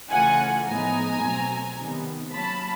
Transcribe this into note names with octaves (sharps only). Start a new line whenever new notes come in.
C#3 E3 A3 C#4 F4 F#5 G#5
A2 F3 G#3 B3 D#4 G#5 A#5
B2 F#3 A3 C4
C3 D#3 G3 B3
F#3 A#3 C#4 F4 A5 B5